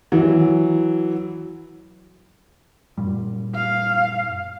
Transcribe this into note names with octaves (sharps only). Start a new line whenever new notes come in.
E3 F#3
F#2 A#2 G3
F5